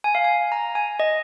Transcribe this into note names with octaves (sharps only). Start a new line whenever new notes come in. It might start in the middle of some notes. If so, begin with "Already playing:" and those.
G#5
F5
G#5
A#5
G#5
D#5